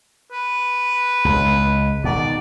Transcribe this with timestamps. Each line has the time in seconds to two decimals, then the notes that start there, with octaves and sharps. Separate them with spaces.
0.32 B4
1.25 C#2
2.04 B2 D#3 D5